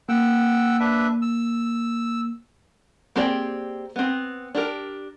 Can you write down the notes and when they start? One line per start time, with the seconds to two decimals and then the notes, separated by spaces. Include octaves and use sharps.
0.09 A#3 F#5 G5 E6
0.80 D4 B4 E5
1.22 E6
3.16 A#3 C4 G4 G#4 D5
3.96 B3 C4
4.55 D4 G4 A#4